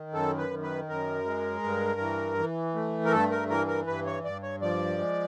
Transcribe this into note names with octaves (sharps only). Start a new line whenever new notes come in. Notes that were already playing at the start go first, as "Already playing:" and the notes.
Already playing: D#3
F#2 A4
B4
D#3
B4
F#2 A#4
G#3
G2
E3
E3
A3
A#4
G2 A4
A#4
E3 A#4
A#4
G2 B4
C#5
G2 D5
C#5
F3 D5
G#3